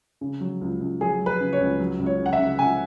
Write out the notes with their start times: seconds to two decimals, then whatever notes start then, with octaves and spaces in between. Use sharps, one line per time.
0.21 C#3
0.40 F#3
0.61 C#2
0.81 C#2
1.01 F#3 G#4
1.20 F#3
1.26 B4
1.40 C#3
1.53 C#5
1.60 C#2
1.80 F#3
1.99 C#2
2.06 C#5
2.19 C#3
2.26 F#5
2.33 E5
2.39 C#3
2.59 C#2 G#5